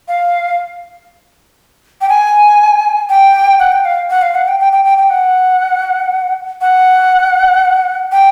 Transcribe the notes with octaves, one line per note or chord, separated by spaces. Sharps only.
F5
G5
G#5
G5
F#5
G5
F5
F#5
F5
F#5
G5
G5
G5
G5
G5
F#5
F#5
G5